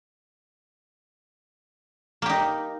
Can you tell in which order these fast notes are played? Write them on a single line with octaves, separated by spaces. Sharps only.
A#3 G4 D#4